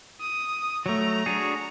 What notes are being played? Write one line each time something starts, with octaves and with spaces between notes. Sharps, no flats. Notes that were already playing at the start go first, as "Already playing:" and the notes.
D#6
F#3 A3 A#5
D4 F#4 G#4